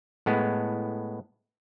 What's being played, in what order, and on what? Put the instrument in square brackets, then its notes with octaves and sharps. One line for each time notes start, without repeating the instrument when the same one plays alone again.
[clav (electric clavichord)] A2 G#3 B3